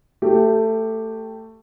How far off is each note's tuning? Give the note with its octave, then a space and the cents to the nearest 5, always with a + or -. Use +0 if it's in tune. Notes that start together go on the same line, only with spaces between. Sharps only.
A3 +15 G4 +0